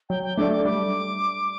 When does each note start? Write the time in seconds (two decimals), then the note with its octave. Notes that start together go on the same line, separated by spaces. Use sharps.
0.09 F#3 G5
0.23 G5
0.37 A3 D4 A4 D5 D6
0.52 D6
0.65 G3 D6